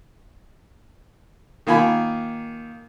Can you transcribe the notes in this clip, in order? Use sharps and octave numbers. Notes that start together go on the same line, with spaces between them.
D#3 A#3 F4 G#5 B5